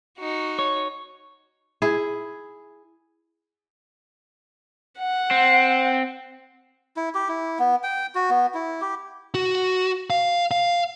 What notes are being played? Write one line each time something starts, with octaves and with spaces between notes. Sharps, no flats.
D#4 F#4
C#5
E4 G#4
F#5
C4
E4
G4
E4
B3
G5
F#4
B3
E4
G4
F#4
F5
F5